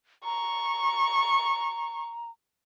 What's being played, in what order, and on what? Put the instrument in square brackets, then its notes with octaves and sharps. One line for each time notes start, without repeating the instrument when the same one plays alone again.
[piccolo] A#5 [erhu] C#6